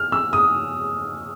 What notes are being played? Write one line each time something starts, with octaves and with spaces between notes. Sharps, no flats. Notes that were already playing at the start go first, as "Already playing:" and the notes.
Already playing: F6
E6
D#6